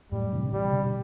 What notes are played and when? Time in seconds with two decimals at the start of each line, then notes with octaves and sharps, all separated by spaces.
0.12 F#2 A2 G3
0.32 C3 E3
0.45 D3
0.53 C3 E3 G3
0.72 B2 D3